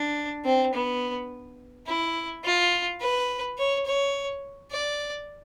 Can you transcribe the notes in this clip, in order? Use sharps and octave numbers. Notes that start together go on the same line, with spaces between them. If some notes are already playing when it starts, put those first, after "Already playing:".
Already playing: D4
C4
B3
E4
F4
B4
C#5
C#5
D5